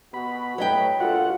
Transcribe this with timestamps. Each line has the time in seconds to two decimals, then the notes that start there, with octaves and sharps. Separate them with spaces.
0.14 B2 F#4 B5
0.58 A2 F#3 B4 C#5 D#5 G5
1.00 G2 A#2 F4 F#4 A4 F#5